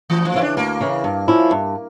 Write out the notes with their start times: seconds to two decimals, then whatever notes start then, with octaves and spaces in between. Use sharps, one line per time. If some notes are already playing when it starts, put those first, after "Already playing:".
0.10 D2 E3
0.25 F3
0.34 C#3 E3 E4
0.41 D4
0.57 D2 A#3
0.80 C#3 E3
1.04 G2
1.28 F3 C#4 E4
1.51 G2